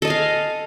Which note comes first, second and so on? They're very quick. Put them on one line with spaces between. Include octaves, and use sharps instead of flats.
A4 D#5 G#5 F5